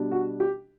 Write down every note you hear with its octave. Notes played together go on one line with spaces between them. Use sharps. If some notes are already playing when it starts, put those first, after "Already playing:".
Already playing: B2 G3 D4
F#4
G4